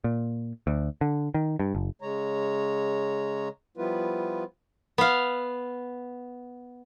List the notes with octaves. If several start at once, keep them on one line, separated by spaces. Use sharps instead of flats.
A#2
D2
D3
D#3
G2
F#1
C#3 G#3 C#5 A#5
F3 G3 B3 E4 F4 B4
B3 F5